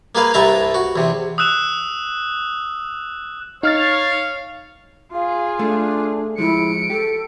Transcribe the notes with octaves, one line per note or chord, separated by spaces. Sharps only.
A#3 G#4 B4 F5
C2 G2 B4 E5 A5 A#5
F#4
E2 C3
D#6 E6 F#6 E7
D#4 C#5 F5 F6 A6
F4 G#4 F5
A3 D4
F3 G#3 E4 C#7 D7
G4 A4